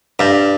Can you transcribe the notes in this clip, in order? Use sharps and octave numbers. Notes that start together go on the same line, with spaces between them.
G2